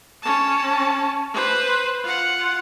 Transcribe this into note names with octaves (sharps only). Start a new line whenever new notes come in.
C#4 A5
B4 C5
F4 F#5